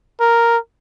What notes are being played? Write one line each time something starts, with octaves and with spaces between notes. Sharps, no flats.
A#4